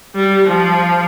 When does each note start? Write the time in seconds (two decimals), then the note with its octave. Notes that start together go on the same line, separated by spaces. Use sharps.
0.15 G3
0.47 F3